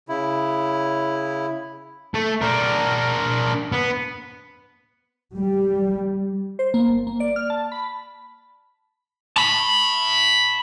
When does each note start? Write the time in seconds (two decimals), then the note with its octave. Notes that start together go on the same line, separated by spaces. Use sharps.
0.09 C#3 E4
2.14 A3
2.41 D4 A#4
3.72 B3
5.36 G3
6.59 C5
6.74 A#3
6.88 G1
7.07 A#3
7.20 D5
7.36 F6
7.50 A5
7.72 B5
9.36 A5 B5